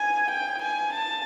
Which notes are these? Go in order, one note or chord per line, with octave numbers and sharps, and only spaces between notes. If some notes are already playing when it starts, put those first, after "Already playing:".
Already playing: G#5
G5
G#5
A5